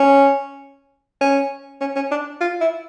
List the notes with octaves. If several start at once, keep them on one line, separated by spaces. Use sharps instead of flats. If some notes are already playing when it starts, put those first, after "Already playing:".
Already playing: C#4
C#4
C#4
C#4
D4
F4
E4